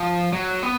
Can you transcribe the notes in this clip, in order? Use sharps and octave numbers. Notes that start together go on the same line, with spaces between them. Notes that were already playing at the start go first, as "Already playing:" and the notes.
Already playing: F3
F#3
B3